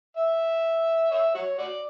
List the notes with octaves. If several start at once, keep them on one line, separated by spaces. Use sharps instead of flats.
E5
C#5 E5
F#4 C#5
F#4 D5